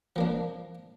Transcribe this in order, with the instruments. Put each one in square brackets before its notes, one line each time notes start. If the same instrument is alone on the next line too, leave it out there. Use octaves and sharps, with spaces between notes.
[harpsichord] F3 A#3 D4